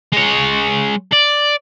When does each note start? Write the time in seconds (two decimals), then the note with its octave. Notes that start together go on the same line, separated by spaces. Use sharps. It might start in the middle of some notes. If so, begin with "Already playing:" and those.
0.13 G#3 C#5
1.13 D5